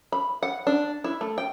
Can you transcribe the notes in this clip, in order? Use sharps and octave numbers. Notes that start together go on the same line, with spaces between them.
B5
F#5
D4
E4
A3
G5